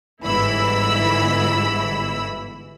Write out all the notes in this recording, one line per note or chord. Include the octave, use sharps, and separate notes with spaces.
G1 G#2 E3 E4 B5 E6